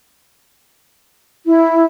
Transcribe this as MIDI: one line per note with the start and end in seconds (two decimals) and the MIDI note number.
1.46 1.85 64